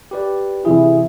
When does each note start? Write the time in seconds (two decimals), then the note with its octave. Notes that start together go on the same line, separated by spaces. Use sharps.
0.11 G4 B4 D5
0.65 C3 E3 E4 G#4